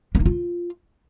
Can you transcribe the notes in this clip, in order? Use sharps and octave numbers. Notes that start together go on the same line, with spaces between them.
A#3
D#4
F4